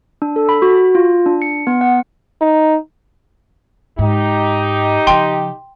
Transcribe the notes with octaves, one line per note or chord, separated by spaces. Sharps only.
D4
A4
B5
F#4
F4
D4
C#7
B3
F#5
D#4
G#2 D#4 G4
C#3 F3 G5 C6